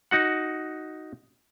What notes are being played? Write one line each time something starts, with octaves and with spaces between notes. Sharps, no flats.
D#4 F#4 F#5